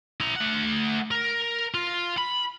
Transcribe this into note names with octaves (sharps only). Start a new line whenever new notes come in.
E4 A#5
A3 F#5
A#4
F4
B5